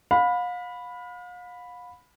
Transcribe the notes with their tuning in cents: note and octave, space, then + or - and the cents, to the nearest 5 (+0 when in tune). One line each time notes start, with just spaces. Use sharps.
F5 +40 B5 +0